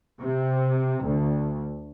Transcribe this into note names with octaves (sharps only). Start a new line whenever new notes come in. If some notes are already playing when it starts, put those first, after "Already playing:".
C3
D2